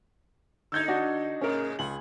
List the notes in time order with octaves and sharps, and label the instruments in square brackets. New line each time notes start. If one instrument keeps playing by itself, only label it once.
[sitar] D3 D#4 [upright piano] E6 G6 G#6
[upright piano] D4 F#4 D#5
[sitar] A2 C#3 G#3 [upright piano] C#4 A#4
[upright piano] C#2 F#7 [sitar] G#4